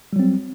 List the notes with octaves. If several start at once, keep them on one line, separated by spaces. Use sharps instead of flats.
F#3 G3 C4